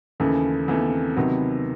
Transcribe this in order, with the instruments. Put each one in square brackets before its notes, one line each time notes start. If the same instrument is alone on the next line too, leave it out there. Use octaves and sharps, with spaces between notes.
[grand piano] D#2 C#3 E3 A3 [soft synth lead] C#4
[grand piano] D#2 C#3 E3 A3 [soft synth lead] C4
[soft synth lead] B3
C4
[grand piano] C3 D#3 F#3 B3